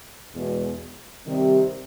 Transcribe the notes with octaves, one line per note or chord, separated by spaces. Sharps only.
E2 B2 G#3
C3 D#3 G3